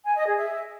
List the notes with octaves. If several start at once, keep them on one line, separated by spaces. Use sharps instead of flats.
G#5
D#5
G#4
E5